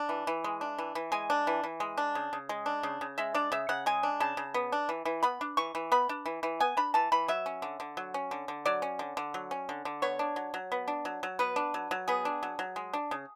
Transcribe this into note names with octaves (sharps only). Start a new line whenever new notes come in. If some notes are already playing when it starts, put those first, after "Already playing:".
Already playing: D4
E3
E3
G#3
D4
E3
E3
G#3 G#5
D4
E3
E3
G#3
D4
C#3
C#3
G#3
D4
C#3
C#3
G#3 E5
D4 D5
C#3 E5
C#3 F#5
G#3 G#5
D4
C#3 A5
C#3
B3
D4
E3
E3
B3 B5
D4
E3 C#6
E3
B3 B5
D4
E3
E3
B3 G#5
D4 B5
E3 A5
E3 B5
F#3 E5
C#4
D3
D3
F#3
C#4
D3
D3
F#3 D5
C#4
D3
D3
F#3
C#4
D3
D3
B3 C#5
D4
F#3
F#3
B3
D4
F#3
F#3
B3 B4
D4
F#3
F#3
B3 G#4
D4
F#3
F#3
G#3
D4
C#3